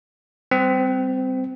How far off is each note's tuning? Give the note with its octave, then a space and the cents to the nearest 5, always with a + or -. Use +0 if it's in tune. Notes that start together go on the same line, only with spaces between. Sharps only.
G3 +0 C4 -20